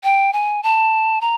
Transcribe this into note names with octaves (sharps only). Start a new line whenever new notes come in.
G5
G#5
A5
A#5